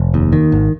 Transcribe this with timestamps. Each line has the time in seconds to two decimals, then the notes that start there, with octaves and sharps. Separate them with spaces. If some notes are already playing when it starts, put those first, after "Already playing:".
Already playing: F1
0.14 D#2
0.33 D#3
0.52 G#1